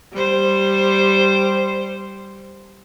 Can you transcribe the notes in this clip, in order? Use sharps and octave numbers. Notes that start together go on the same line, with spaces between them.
G3 C5